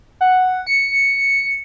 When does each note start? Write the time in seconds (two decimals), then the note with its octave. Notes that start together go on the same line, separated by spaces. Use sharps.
0.21 F#5
0.67 C#7